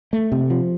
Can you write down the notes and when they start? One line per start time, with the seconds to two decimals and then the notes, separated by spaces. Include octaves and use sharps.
0.13 A3
0.32 C3
0.50 F3